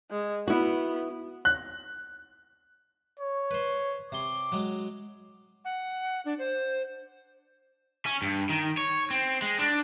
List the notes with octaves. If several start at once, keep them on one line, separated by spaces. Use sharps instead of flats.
G#3
B3 E4 F#4
F#6
C#5
B4 C5
C3 C6 D6
F#3 G#3
F#5
D4
C5
C#4
G2
D#3
C#5
C4
G#3
D4